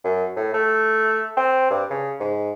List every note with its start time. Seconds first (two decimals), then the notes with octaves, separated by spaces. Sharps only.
0.05 F#2
0.36 A2
0.54 A3
1.37 C4
1.70 G2
1.90 C#3
2.20 G#2